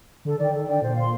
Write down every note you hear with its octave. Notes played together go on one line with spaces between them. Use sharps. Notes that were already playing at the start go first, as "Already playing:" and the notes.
D3 A4
D#3 D5 G5
D#3 A4
D#3
D3 D5 G5
A#2 C5
F5 C6